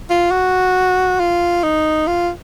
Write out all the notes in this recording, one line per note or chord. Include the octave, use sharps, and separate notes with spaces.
F4
F#4
F4
D#4
F4